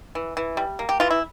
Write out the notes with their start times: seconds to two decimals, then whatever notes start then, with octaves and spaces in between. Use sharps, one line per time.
0.15 E3
0.37 E3
0.57 G3
0.79 A#3
0.89 G4
1.00 E3 F4
1.11 E4